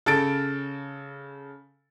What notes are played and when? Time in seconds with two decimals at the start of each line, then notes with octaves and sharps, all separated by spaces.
0.06 C#3 A4 A6 D7